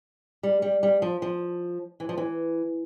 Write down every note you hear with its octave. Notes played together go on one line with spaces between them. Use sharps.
G3
G3
G3
F3
F3
E3
F3
E3